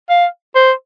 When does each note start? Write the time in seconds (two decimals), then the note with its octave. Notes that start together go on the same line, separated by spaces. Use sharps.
0.09 F5
0.55 C5